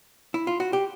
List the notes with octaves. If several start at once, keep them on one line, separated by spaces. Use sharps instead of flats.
E4
F4
F#4
G4